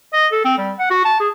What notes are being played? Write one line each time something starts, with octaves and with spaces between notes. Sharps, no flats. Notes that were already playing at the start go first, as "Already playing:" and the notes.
D#5
A4
C4
G3
F#5
F#4
A5
G#4